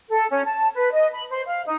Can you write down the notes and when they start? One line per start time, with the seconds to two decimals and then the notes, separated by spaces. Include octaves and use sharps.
0.09 A4
0.30 C#4
0.45 A5
0.75 B4
0.92 D#5
1.13 B5
1.29 C5
1.46 F5
1.65 D#4